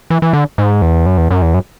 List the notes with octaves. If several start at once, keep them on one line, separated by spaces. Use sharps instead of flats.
E3
E3
D3
G#2
E2
F#2
E2
F#2
E2
F#2